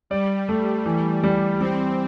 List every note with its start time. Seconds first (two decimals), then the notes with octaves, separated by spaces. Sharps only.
0.10 G3 D5
0.49 A3
0.86 E3
1.23 G3
1.60 G3 C4